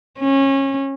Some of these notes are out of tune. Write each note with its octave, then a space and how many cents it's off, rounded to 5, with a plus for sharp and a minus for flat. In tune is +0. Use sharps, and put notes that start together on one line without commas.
C#4 -25